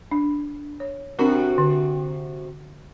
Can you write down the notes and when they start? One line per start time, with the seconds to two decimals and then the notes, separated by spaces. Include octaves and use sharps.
0.11 D4
0.80 C#5
1.19 C3 C4 D4 F#4 A#4
1.58 D3